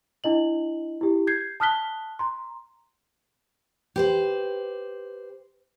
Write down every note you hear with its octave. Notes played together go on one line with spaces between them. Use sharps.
D4 E4 D#5 F#7
E4 G4
G6 G#6 C7
A5 D#6 F6 F#6 B6 G7
A#5 C6
G4 B4 C5